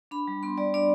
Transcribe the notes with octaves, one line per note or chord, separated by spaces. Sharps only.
D4 B5
G3
B3 C6
G3 D5
D4 D5